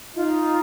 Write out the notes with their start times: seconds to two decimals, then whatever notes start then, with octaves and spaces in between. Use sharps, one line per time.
0.16 D#4 F4